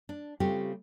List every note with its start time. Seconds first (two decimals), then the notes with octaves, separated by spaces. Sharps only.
0.09 D4
0.40 C#3 G3 A3 C4 F4 G4